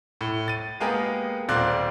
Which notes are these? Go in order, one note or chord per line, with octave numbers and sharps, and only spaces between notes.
A2
A6 D#7
G#3 A#3 B3 G4 G#4 A#4
D#1 C4 F4 D5 C6 F#6